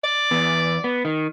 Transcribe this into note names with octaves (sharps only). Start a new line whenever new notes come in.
D5
E2 B3
B3
D#3